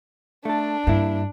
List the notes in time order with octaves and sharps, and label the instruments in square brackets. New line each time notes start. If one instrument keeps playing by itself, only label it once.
[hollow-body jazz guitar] A3 A4 [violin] D4
[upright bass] G2 [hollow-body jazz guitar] A#3 E4